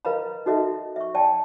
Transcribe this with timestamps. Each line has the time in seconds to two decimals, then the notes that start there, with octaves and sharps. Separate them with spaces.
0.05 A#4 B4 D#5 F5 A#5 B5
0.46 D#4 F#4 A4 D#5 E5
0.96 E5 C#6
1.15 D5 G5 A5